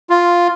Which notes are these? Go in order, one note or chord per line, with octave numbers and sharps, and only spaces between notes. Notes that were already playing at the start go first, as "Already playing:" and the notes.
F4